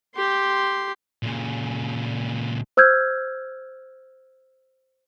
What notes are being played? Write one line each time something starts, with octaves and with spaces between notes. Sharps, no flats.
G4 C6
A#2 C#3
C5 E6 F6 G6 G#6